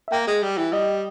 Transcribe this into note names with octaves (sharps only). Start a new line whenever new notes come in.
E5
A#3 G5
G#3
G3
E3
G3 D#5